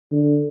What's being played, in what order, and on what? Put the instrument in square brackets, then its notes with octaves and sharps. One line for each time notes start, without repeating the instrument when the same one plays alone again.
[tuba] D3